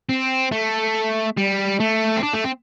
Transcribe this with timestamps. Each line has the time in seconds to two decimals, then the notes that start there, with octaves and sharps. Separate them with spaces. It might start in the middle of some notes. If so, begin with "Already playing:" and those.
0.09 C4
0.52 A3
1.38 G3
1.80 A3
2.17 C4
2.23 D4
2.34 A3
2.44 C4